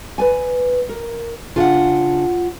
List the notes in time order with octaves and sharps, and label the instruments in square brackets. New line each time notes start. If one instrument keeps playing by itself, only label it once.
[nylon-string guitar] B4 D5 G#5
A#4
[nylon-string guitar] C#3 D4 G#4 [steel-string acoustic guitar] F4 F#5